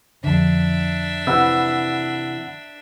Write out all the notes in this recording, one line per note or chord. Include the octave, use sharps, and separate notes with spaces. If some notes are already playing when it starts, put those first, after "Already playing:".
F2 D3 D4 E5
C3 E3 F#5 B5 E6